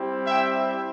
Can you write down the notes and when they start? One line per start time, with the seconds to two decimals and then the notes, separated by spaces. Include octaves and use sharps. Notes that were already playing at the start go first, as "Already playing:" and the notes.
Already playing: G3 C4 E4 G4
0.27 E5 G5